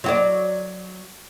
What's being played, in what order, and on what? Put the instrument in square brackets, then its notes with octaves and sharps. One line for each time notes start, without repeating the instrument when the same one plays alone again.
[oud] F#3 F#4 D5